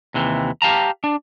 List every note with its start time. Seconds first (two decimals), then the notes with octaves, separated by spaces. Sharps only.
0.14 D#2 C3 E3
0.62 G4 F5 A5 A#5
1.04 D4